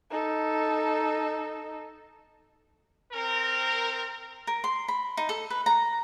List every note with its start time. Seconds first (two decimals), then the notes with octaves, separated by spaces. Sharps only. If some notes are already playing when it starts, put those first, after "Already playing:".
0.10 D#4 A4
3.12 C4 A#4
4.47 A#4
4.64 C6
4.88 B5
5.17 D#4
5.29 A4
5.50 B4
5.66 A#5